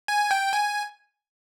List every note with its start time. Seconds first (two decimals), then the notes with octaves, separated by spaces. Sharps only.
0.08 G#5
0.31 G5
0.53 G#5